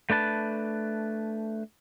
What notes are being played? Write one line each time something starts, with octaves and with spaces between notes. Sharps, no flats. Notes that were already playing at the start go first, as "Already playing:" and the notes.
A3 D4 B4 A5